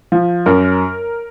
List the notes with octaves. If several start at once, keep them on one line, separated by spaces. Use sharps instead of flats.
F3
F#2 A#4